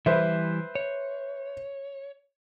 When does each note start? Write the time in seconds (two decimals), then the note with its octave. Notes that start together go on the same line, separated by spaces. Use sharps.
0.06 E3 G3 B4 C5 E5
0.75 C#5